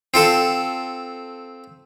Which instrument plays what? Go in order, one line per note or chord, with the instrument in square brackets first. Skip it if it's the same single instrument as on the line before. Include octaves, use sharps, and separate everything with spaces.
[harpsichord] C4 F4 A4